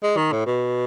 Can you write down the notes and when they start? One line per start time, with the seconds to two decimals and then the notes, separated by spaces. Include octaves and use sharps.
0.03 G#3
0.17 D#3
0.32 A2
0.46 B2